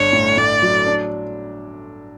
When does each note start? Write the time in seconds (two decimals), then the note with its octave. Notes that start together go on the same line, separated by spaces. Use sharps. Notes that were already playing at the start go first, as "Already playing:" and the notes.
Already playing: G1 D4 C#5
0.13 A2
0.37 A2 D5
0.62 F#3
0.86 D4